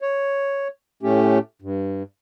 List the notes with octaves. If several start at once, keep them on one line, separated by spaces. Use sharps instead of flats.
C#5
A2 A3 C#4 G4
G2